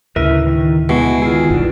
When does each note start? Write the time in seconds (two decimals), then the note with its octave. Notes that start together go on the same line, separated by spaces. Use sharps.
0.16 D2 A2 C#3 E4 A#4 B4 E5
0.47 D#3
0.89 B2 G#3 E4 F#4 G#4
1.22 D#3 E4 F4 G#4
1.50 E1 B1 G2 B2 D4